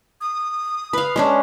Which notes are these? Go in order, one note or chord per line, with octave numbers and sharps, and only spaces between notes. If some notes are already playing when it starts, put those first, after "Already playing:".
D#6
B4 F5
G#3 C#4 D4